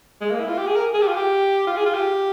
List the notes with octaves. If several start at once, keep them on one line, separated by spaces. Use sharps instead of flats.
G#3
A#3
E4
F4
G4
G#4
A#4
G#4
G4
F4
G4
F4
G#4
F4
G4